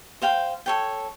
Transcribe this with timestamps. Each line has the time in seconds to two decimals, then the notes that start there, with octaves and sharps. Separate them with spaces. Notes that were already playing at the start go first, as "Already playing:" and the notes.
0.22 C5 F5 G5
0.66 A4 C#5 G5